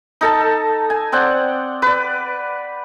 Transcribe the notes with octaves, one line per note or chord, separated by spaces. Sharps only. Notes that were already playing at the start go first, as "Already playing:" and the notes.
D#4 A4 A5
G#5
C4 D5 F#5 G5
B4 D5